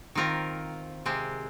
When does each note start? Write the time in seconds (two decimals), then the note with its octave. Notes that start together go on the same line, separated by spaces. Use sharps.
0.15 D#3 C4 F4 A#4
1.06 C3 G#3 C4